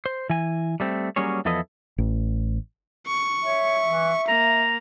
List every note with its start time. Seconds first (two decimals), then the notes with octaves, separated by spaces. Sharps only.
0.06 C5
0.30 E3 G#5
0.80 G3 A3 C4
1.16 F#3 G3 A#3 C#4 G#4 C#5
1.45 E2 F3 E4 A4 B4 D#5
1.98 A1
3.07 C#6
3.43 C#5 E5
3.86 E3
4.28 A#3 A#5